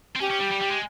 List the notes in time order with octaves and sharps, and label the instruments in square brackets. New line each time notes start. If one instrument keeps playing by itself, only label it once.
[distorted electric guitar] C4
[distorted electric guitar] C#4 [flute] G4
[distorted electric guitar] C#4
G3
G3
G3
G#3